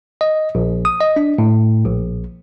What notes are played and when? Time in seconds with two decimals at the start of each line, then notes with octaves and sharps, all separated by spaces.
0.21 D#5
0.55 A#1
0.85 D#6
1.01 D#5
1.16 D4
1.38 A2
1.85 A#1